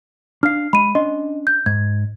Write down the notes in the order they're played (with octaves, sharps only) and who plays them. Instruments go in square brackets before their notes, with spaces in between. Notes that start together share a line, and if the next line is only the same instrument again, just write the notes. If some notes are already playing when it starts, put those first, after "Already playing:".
[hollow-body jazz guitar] D4 F5 [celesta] F6 C7
[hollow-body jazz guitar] G#3 [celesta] B5 D#7
[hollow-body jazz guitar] C#4 D4 C6 [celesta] D#5
[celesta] G6
[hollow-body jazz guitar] G#2 [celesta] G#6